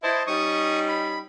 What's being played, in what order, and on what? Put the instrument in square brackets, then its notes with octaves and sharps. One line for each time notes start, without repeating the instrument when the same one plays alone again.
[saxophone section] E4 [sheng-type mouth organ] C5 D#5 A5
[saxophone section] G3 C#4 D#4 [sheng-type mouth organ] C#6 D#6
[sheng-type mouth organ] B5